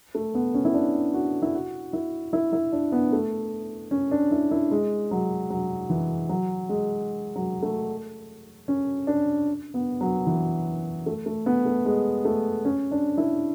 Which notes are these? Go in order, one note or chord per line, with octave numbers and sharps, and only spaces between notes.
A3
B3
C#4
E4
D4
F#4
E4
F#4
E4
E4
E4
D4
B3
A3
C#4
D4
E4
E4
G#3
F#3
F#3
E3
F#3
G#3
F#3
A3
C#4
D4
B3
F#3
E3
A3
A3
B3
A3
G#3
A3
C#4
D4
E4